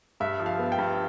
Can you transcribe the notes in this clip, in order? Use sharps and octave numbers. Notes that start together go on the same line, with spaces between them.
G2 E5
F3
F5
B3
G5
G2